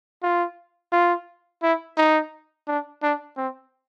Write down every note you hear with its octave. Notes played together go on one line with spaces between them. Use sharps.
F4
F4
E4
D#4
D4
D4
C4